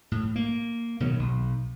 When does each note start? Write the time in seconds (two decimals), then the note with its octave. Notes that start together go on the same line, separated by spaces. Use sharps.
0.12 A2
0.36 A#3
1.00 B2 D#3 F#3
1.19 B1